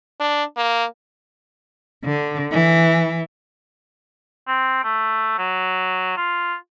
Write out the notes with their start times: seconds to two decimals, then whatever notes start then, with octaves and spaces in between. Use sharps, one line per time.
0.20 D4
0.57 A#3
2.04 D3
2.52 E3
4.48 C4
4.84 A3
5.39 F#3
6.17 F4